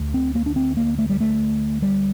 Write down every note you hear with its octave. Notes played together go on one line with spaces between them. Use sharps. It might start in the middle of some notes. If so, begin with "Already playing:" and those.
Already playing: D2 D3
C4
A#3
D4
C4
A#3
A3
G3
A3
G3